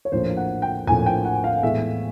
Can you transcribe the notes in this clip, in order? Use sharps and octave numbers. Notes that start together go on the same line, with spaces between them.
C#5
A#1 A2 F3 A#3 C5
F#5
G5
A#1 A2 F3 A#3 G#5
G5
F#5
F5
A2 E3 G#3 B3 E5